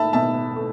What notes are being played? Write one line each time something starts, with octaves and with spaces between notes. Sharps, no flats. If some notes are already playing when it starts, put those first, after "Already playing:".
Already playing: A3 E5 A5 B5
B2 E5 A5
A3